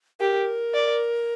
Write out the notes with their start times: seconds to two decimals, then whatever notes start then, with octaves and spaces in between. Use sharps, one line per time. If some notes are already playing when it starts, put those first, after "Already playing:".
0.20 G4 A#4
0.74 D5